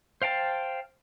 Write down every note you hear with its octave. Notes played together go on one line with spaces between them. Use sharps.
C5 F5 G5 A5